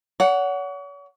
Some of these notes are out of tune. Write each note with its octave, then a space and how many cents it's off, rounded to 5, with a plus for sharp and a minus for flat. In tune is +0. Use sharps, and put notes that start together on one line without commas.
C#5 +40 F#5 +0